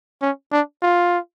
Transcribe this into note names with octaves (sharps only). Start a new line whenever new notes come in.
C#4
D4
F4